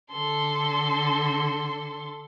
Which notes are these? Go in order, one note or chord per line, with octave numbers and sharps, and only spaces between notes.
D3 A4 C6